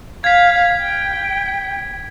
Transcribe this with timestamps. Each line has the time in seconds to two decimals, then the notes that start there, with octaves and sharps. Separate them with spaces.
0.24 F5 G#6 B6
0.81 G5